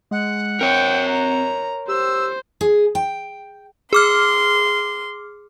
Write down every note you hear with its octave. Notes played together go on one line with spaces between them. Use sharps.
G#3 F#5
C4 A#4 C#5 G5
A#5
G4 C5 E6
G#4
G5
G#4 C6 D6 F6